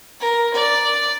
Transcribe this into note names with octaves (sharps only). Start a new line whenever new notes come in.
A#4
D5